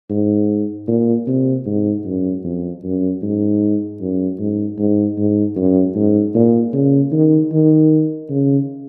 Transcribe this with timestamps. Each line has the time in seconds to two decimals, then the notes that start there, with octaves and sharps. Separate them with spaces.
0.10 G#2
0.88 A#2
1.27 C3
1.66 G#2
2.05 F#2
2.44 F2
2.83 F#2
3.22 G#2
4.01 F#2
4.39 G#2
4.78 G#2
5.18 G#2
5.56 F#2
5.96 G#2
6.35 A#2
6.73 C#3
7.12 D#3
7.52 D#3
8.30 C#3